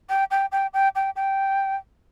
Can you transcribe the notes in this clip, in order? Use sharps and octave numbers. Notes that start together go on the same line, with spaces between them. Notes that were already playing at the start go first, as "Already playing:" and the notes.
G5
G5
G5
G5
G5
G5